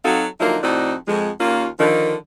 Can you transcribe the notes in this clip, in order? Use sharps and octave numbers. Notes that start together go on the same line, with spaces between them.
F#3 C4 D#4 F#4 A4 F5
D3 F3 F#3 A#3 D#4 E4
F2 A2 C4 D#4 F#4 D5
F2 G#3
D#2 A#3 C#4 F4
D3 D#3 F3